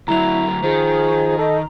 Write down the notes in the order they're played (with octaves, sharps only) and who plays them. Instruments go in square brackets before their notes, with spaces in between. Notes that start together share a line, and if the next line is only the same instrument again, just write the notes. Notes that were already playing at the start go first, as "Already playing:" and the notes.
[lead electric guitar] D2 F#3 [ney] E4 [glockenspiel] A#5 F7
[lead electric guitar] D#3 [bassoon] F3 [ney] G#4
[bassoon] A4 [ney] D#5